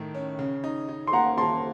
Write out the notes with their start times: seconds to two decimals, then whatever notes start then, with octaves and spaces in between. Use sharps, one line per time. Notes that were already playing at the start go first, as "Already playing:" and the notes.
Already playing: A2 D#3 A3
0.15 C#4
0.39 C#3
0.64 D#4
0.89 D#4
1.07 C6
1.13 A#3 F#5 A#5
1.38 A#3 A5 C6